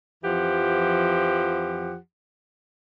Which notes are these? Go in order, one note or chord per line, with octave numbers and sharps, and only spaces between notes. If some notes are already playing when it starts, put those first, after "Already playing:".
F2 E3 F3 G4 F#5